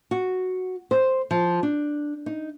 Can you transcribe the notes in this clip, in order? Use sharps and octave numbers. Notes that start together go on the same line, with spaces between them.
F#4
C5
F3
D4
D#4